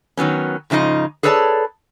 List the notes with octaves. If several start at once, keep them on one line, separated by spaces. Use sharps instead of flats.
D#3 F#3 B3 C#4
G#2 C#3 F3 D#4 D#5
G#4 A4 B4 C#5 D5 A5